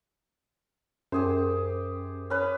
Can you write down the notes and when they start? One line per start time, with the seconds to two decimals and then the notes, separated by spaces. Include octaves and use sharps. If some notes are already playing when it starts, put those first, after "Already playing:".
1.12 F#2 G4 G#4 C5
2.30 C#4 B4